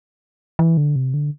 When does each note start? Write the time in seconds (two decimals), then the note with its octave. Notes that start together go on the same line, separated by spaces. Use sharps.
0.59 E3
0.77 D3
0.96 C3
1.14 D3